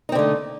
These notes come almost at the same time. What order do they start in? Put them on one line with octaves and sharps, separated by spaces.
D#4 C4 D3 A3